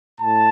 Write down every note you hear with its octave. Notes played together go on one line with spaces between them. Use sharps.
A2 A5